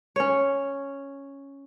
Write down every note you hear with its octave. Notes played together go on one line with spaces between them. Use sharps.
C#4 C#5